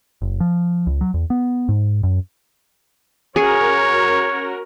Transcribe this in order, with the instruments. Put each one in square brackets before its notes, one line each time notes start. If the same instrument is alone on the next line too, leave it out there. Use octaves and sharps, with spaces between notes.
[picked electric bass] F#1
F3
C#2
F#3
E2
B3
G#2
F#2
[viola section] C#4 F#4 A#4 [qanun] G#4 [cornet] C#5